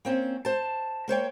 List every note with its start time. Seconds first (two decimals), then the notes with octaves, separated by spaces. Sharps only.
0.05 A#3 C4 C#4
0.45 C5 A5
1.08 A#3 C5 C#5 G5